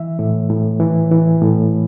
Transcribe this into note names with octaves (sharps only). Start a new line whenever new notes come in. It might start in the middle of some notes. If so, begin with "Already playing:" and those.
Already playing: E3 E5
A2
A2
E3
E3
A2